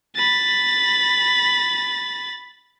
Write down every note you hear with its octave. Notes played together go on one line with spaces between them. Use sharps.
B5 A6